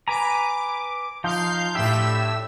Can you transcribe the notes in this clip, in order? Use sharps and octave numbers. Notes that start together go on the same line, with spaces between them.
B4 G#5 A#5 D6
F3 D#4 F5 C6 G6
A2 D4 E4 G4 E5 E6